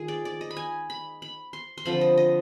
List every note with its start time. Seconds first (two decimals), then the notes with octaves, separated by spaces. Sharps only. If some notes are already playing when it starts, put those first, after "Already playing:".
Already playing: D#3 G#3 F4 G#4
0.08 D5
0.25 D5
0.41 D#5
0.50 B5
0.57 G#5
0.90 B5
1.22 B5
1.53 C6
1.78 C6
1.85 D3 F3 C4 B5
2.01 D#5
2.18 D#5